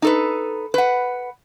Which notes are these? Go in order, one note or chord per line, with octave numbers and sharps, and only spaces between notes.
D#4 A4 B4
B4 F#5